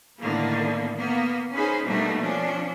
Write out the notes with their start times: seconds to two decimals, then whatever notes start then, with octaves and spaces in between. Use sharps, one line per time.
0.20 A2 D3 D#3 A#3 B3
0.97 A#3 B3
1.53 C#4 D#4 G#4 B4 C5
1.87 B2 G3 A3 A#3 D4 D#4
2.21 F3 C#4 D4